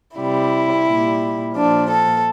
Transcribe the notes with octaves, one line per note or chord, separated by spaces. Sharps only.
C3 G3 E4
A#2 G3
A#2 F3 D4
A4